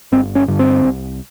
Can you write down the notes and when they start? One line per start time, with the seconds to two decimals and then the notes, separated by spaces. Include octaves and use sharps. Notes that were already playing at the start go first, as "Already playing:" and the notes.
0.12 G1 C4
0.35 C#4
0.48 G2 D3
0.59 C4
0.83 C2